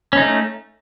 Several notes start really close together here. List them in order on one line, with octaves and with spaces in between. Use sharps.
C#4 D#4 A3